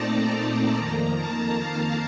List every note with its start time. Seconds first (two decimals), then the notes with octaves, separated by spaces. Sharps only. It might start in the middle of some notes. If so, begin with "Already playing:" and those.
Already playing: A#2 A3 C4 D#4 D5 A5 A#5
0.33 A#5
0.75 F2 D#3 A#3
1.17 A5
1.59 F5